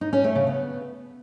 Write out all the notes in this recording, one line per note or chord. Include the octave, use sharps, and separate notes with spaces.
D#4
C#4
A3
C#3
B3